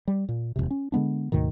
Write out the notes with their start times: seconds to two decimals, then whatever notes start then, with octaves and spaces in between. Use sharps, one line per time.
0.08 G3
0.29 A#2
0.56 D#1 B1 F2 C3
0.71 C#4
0.92 D3 G#3 B3 D4
1.32 D2 G#2 B2 D#3